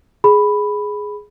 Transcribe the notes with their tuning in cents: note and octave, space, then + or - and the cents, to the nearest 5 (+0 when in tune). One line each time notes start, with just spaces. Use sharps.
G#4 +5 B5 +0